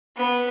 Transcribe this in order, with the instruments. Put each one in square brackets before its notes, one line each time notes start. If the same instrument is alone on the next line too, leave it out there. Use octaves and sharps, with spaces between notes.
[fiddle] B3